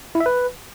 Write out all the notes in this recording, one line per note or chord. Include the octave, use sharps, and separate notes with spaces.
E4
E5
B4